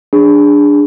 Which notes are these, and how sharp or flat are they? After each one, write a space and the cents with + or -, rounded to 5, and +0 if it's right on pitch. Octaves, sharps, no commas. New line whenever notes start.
D4 +0 G#4 -20